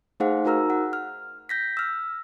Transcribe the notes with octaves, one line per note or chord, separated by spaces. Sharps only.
A3 D#4 G#4 C5 F5 F#5
D#4 F#4 A#4 A#5 E6 F6
F#5
F6
G6 A#6 B6
E6 F6